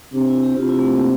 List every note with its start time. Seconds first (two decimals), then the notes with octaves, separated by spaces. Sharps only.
0.13 C3 D4
0.28 E4
0.43 G4
0.57 C3 F4
0.69 E4
0.79 A3
0.91 A#3